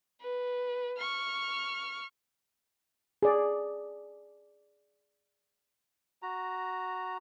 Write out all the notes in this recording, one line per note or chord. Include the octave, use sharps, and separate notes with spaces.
B4
C#6 F6
G#4 D5
F#4 A#5